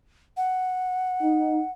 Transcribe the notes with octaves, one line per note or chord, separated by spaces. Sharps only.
F#5
D#4